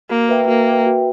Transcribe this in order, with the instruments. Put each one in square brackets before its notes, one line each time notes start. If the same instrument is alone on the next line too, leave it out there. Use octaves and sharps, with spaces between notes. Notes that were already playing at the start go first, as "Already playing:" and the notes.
[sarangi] A#3 [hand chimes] F#4
[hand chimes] B4 E5 G5
[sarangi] A#3 [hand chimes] F#4
[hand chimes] B4 E5 G5
F#4